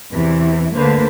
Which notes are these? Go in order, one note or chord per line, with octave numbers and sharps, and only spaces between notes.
E2 C3 E3
D2 D3 A#3 B4 C5